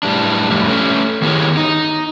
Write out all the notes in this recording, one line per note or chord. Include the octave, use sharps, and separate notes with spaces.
A2 G3 D4
F2 A2 D3 G3
A3 C#4
D#3 B3 E4 G4 G#4 C#5
D#4